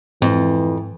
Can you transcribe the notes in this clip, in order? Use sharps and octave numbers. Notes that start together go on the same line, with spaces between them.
F2 G#2 E3